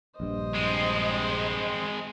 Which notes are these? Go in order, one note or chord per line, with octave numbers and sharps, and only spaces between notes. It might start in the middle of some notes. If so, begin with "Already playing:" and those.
A#1 G2 C5 D#5
G#3 C4